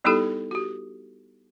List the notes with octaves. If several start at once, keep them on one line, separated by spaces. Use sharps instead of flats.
G3 B3 D#4 E4 G4 A4
F#4 G4